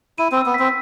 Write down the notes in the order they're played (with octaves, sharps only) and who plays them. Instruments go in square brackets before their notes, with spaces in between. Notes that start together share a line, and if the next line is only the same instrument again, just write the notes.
[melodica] E4 [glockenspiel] D#7
[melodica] C4
[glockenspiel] E6
[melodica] B3
[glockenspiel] B6
[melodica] C4